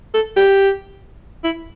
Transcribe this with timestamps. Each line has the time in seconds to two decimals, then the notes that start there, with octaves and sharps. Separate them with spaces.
0.14 A4
0.37 G4
1.44 E4